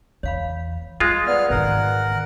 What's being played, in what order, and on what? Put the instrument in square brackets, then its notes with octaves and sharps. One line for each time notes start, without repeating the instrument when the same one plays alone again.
[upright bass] E2 [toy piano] C#5 F5 B5
[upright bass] G3 [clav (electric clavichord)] G#3 F4
[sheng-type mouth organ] B3 F6 [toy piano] C5 D5
[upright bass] G#2 D#3 [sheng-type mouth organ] A#4 F#5